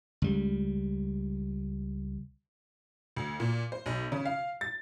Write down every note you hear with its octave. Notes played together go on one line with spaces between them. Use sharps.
C#2 G3
D2
A#2
C5
B1
C#3
F5
A6